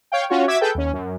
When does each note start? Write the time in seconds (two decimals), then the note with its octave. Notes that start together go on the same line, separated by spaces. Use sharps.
0.12 C#5 F5 G5
0.30 C#4 F4 F#4 C#5
0.48 F#4 E5 D6 G#6 B6 E7
0.61 G#4 A4 B4 G5 G6
0.75 D#2 C#4
0.93 F#2